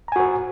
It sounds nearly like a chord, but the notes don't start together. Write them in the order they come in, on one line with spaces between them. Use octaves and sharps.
A#5 G#5 F#4 C5